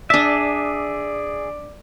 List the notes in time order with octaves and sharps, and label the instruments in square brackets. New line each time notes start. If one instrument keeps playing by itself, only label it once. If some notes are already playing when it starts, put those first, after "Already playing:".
[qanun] D4 A5 [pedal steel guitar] G#4 E5 [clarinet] D5 [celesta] B6